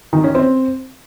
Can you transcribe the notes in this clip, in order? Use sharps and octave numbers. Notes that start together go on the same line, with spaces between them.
D#3
C#4
C4